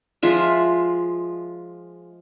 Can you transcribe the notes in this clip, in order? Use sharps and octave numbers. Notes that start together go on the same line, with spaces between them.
F3 G#3 F4 E5